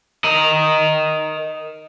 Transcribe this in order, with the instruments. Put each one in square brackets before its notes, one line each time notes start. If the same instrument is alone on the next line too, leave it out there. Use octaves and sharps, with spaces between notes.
[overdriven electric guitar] A#4 D#5